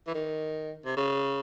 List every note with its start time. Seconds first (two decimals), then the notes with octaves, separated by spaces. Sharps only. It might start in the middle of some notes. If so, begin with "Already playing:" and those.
0.07 E3
0.15 D#3
0.86 C3
0.97 C#3